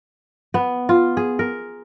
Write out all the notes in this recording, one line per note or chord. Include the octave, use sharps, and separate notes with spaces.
B3
F4
G#4
A#4